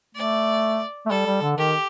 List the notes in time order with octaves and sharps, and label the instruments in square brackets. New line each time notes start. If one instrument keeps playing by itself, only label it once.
[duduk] A3 [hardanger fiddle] D5
[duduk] A3
[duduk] G3 [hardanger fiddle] A4
[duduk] G3
D3
[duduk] D#3 [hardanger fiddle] G4